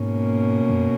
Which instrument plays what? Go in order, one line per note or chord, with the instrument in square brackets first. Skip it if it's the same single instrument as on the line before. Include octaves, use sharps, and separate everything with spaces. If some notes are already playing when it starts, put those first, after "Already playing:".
Already playing: [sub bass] G#2 [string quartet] B2 A#3 C#4
[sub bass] F#2